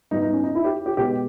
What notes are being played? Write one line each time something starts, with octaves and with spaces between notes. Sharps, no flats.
G#2 G3 B3 D#4
D#4
C#4
D#4
E4
G4
G4
B2 G#3 B3 G4